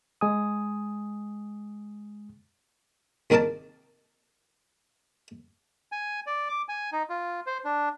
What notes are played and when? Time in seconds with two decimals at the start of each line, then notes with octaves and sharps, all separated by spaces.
0.21 G#3 G#5 D#6
3.30 C2 D#3 G#4 A#4 D5 A5
5.92 G#5
6.27 D5
6.49 D6
6.69 G#5
6.92 D#4
7.09 F4
7.47 C5
7.65 D4